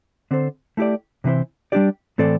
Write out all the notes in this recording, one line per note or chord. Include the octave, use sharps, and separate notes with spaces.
D3 C4 A4 C5
A3 E4 G4 D5
C3 E3 C4 E4 C5
G3 D4 G4 D5
A2 E3 C4 A4 D5